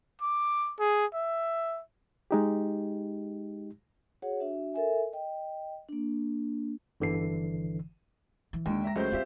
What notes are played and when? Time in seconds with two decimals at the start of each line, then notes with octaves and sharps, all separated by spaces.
0.22 D6
0.79 G#4
1.14 E5
2.31 G#3 D#4 G4
4.22 F#4 G#4 C#5 F#5
4.40 D4 F#4 E5
4.74 A4 A#4 E5 G#5
5.13 D#5 G5
5.89 A#3 D4
7.00 G1 D3 E3 C7
8.53 E3
8.66 D#2 D3 G#3 G5
8.84 E5 A#5 A#6
8.96 C#2 F#3 A3 C5
9.12 C4 C#4 F4 G4 E5